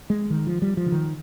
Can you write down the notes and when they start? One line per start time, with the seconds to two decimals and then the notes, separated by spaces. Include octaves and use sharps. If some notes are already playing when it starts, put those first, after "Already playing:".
0.10 G#3
0.30 D#3
0.47 F3
0.62 G3
0.77 F3
0.86 D3
0.92 D#3